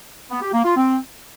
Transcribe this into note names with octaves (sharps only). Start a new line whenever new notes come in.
B3
G4
A#3
F4
C4